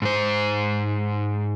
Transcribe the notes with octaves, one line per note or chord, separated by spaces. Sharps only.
G#2 C5